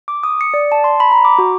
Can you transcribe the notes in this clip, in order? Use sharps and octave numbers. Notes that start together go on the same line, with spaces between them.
D6
D#6
C#7
D5
A5
C6
B5
A#5
D6
F#4